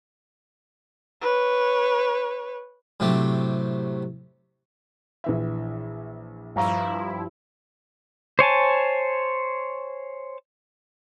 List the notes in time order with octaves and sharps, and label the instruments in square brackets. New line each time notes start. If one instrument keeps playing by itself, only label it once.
[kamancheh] B4 C#5
[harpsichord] A2 C3 F#3 A3 G4
[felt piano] A#1 E3 E5
[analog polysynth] G2 F3 E4 [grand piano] F5 A#5 C#6
[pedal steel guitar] C5 C#5 G#5 A5